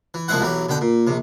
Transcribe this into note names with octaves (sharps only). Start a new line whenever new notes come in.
E3
C2 F3 G#3 C4 E4 F#5
B1 E3 F#3 G4
B2 D3 G5
A#2
A#1 C3